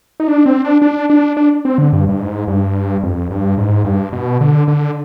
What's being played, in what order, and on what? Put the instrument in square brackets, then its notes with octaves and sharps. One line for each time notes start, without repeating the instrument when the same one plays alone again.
[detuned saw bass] D#4
D4
C4
D4
D4
D4
D4
C4
D3
G2
G2
G#2
G2
F2
G2
G#2
G2
B2
D3
D3